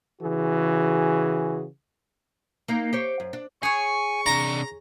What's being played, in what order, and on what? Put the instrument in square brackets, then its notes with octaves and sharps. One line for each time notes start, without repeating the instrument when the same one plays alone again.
[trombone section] C#3 E3 F#4 G#4
[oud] A#3 D#4
G4 C5 C#5
F#2
D4
[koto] G#4 C#5 [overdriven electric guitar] G#5 [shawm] C#6
[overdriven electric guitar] C3 D4 [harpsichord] A#5